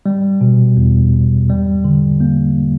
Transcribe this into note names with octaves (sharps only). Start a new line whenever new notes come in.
G3
B2
E2
E2
G3
D3
A#3